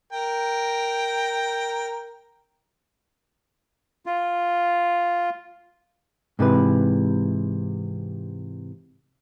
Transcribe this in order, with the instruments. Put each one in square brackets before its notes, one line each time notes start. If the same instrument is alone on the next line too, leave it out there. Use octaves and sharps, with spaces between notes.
[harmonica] A#4 G5 A#5
[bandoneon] F4
[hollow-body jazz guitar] G#2 C3 E3 B4